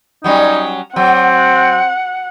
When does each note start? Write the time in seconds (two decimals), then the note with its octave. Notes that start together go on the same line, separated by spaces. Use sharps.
0.24 F#3 G3 C#4 D#4
0.96 F#3 C4 F#5